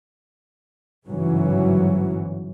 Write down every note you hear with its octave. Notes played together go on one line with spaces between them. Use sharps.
G1 G#2 C#3 E3 F#3